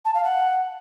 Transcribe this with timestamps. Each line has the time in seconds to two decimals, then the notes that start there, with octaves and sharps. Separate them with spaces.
0.05 A5
0.15 F5
0.24 F#5